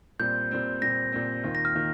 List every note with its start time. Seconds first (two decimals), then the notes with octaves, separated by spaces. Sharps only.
0.19 A#2 G3 C4 G6
0.51 A#2 G3 C4
0.82 A#2 G3 C4 A#6
1.12 A#2 G3 C4
1.44 D#2 D#3 A#3 F4
1.55 A#6
1.65 F6
1.75 D#3 A#3 F4